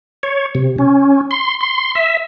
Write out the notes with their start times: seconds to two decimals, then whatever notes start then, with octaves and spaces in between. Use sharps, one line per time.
0.23 C#5
0.55 C3
0.79 C#4
1.31 C6
1.61 C6
1.95 E5